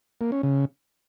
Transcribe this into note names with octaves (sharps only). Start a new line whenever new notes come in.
A#3
C#4
C#3